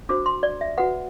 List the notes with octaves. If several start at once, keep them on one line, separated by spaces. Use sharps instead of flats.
D4 F#4 C5 D6
C6
D5
E5
F#4 B4 F#5